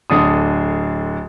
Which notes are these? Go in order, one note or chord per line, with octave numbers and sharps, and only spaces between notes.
D1 D3 D#6